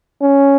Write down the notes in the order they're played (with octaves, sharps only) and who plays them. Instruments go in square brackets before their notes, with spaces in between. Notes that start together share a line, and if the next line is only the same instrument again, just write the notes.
[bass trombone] C#4